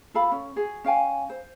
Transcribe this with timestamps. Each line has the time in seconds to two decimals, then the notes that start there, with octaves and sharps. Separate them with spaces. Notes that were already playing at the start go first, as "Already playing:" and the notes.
0.14 F4 A4 F5 B5
0.32 C#4
0.56 F#4 G#4
0.84 C#4 F5 G5 G#5
1.30 C5